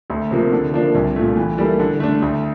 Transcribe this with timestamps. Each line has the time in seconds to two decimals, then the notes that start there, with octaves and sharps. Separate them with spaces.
0.10 D2
0.31 C3 F3 A#3
0.52 D3
0.73 F3 A#3 D4
0.95 C2
1.16 A#2 A3
1.37 E3
1.58 G3 A#3 E4 A4
1.80 D3
2.00 A3 D4
2.22 D2